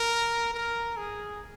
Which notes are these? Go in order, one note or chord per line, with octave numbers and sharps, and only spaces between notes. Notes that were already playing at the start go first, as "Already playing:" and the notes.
Already playing: A#4
A#4
G#4